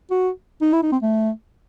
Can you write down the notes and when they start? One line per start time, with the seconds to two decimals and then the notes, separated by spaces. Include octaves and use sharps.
0.11 F#4
0.62 D#4
0.73 E4
0.83 D#4
0.92 C4
1.02 A3